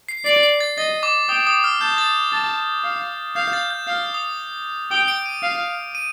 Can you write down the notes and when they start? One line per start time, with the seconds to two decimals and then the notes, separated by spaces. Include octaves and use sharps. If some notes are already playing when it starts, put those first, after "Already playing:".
0.09 C7
0.25 D5 C7
0.43 C7
0.60 A6
0.78 D#5 A6
1.03 D6
1.29 G5 D#6
1.47 D#6
1.64 F6
1.81 A5 G6
1.98 A6
2.33 A5
2.84 F5
3.36 F5 G6
3.48 G6
3.53 A6
3.71 G6
3.87 F5 F6
4.14 D#6
4.91 G5 D#6
5.08 D7
5.26 D#7
5.43 F5
5.95 D#7